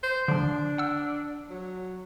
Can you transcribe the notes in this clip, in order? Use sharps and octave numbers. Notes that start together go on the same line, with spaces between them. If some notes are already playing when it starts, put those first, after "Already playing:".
C5
D3 F3 D4
F#5 E6
F#3